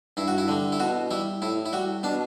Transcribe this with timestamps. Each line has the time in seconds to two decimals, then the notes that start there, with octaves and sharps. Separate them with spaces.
0.17 G2 E4
0.28 F#4
0.38 E4
0.48 D3 G3
0.72 E4
0.80 B2 F#4
1.11 G3 E4
1.42 A2 E4
1.66 E4
1.73 G3 F#4
2.03 B2 D4